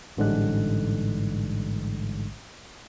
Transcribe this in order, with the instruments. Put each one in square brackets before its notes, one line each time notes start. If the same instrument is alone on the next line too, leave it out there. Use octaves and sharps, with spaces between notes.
[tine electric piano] A1 G#2 D3 G3 G#3 F#6